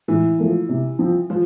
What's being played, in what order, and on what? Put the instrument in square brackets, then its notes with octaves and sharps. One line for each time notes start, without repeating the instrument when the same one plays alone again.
[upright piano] A2 [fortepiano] E3
[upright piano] F3 A3 E4
C3
F3 C4
[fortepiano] F3